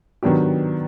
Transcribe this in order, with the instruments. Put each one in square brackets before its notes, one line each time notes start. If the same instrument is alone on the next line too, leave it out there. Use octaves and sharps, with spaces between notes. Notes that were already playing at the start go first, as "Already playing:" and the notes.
[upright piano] D#3 F#3 B3 D4 G4